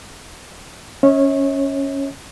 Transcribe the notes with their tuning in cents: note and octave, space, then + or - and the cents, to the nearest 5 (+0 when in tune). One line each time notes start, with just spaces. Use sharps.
C#4 +0 C#5 -25 E5 -45